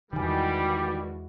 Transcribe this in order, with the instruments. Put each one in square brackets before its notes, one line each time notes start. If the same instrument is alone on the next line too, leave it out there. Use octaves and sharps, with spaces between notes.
[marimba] E2 G#5 [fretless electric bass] D#3 [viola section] E3 G#3 F#4 [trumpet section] G3